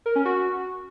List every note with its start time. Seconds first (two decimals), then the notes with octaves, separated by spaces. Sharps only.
0.06 A#4
0.15 C#4
0.25 F#4